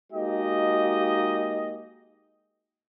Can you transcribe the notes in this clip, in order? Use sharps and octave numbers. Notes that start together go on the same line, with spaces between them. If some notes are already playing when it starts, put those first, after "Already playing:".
G#3 A#3 D#4 F#4 G4 D#5